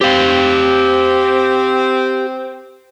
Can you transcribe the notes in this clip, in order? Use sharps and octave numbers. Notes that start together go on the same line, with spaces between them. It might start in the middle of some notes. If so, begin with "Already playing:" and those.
C4 G4 F5